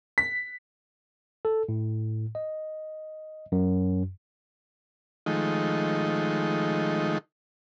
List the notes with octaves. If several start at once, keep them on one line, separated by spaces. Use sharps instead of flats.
B6
A4
A2
D#5
F#2
D#3 F3 G#3 A3 D#4